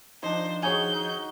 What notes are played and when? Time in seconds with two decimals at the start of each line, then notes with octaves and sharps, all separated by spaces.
0.23 D#3 F3 D4 D#4 C5
0.63 D#4 F#4 G#4 C#5 G#5 G6
0.93 D#4